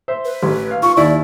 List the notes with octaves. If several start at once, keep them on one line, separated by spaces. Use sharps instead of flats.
C5 E5
B4
A1
F5
F4 C#6
D#2 E4 D5